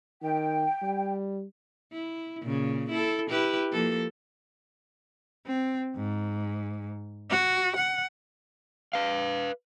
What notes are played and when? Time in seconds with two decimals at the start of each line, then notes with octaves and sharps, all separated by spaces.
0.23 D#3 G5
0.82 G3
1.92 E4
2.42 A#2 C#3
2.90 E4 A4
3.30 E4 G4 B4
3.72 F3 A#3 A4
5.47 C4
5.96 G#2
7.31 F#4
7.76 F#5
8.93 B4 F5